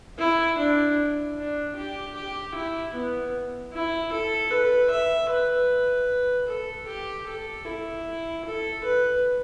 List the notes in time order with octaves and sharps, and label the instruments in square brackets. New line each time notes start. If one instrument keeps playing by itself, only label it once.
[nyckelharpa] E4
D4
D4
G4
G4
E4
B3
E4
A4
B4
E5
B4
A4
G4
A4
E4
A4
B4